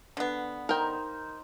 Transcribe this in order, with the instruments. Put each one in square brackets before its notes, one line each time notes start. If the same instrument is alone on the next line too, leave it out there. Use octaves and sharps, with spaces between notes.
[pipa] D3 B3
[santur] D#4 C5 F5 [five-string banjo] A#4 G5